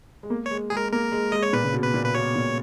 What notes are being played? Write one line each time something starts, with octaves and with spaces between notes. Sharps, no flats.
G#3
A#3
C#5
G#3
G#3 G#4
A#4
A#3 A#4
G#3
G#3 D#5
C#5
A#2 B4
C#3
B2
B4
A#2
B4
B2 C#5
A#2